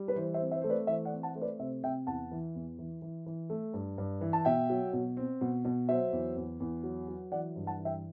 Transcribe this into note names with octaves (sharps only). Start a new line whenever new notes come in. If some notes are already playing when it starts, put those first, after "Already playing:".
Already playing: G3
B4
E3 C5
C5 E5
C4
C5 E5
A3 C5
B4 D5
E3 C5 E5
D5 F#5
C4
F#5 A5
A3 C5
B4 D5
C3 C5 E5
C3 E5 G5
E2 F#5 A5
E3
E2
E3
E3
E3
A3
G2
G2
E3
A5
B2 E5 G5
F#3
B2
C4
B2
B2
F#3 C5 E5
E2
E2
E2
F#3
F#3
E3 D5 F#5
G2
F#5 A5
E3
E5 G5